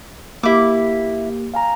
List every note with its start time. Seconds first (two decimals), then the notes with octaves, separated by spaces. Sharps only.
0.43 A#3 E4 G4 D6
1.54 F5 G#5 A#5